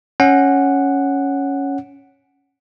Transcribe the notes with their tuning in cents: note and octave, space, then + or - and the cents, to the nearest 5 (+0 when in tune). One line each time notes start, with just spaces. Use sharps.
C#4 +0 F#5 +0